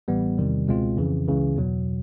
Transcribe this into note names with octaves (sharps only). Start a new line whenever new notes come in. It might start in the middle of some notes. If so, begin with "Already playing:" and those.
A1 A2 E3 G3 B3
E2 C3 D#3 G3
C#2 B2 G#3 C4 F4
F2 C#3 E3
C#2 C#3 E3
E2 B2 F#3